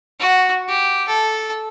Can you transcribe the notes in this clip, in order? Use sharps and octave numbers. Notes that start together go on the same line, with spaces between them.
F#4
G4
A4